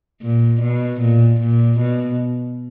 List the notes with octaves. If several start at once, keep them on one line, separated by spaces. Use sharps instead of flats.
A#2
B2
A#2
A#2
B2